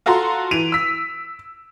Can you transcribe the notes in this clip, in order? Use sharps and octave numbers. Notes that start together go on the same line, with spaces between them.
F4 F#4 A4 A#5 C6
E3 D7 D#7 F7
E6 B6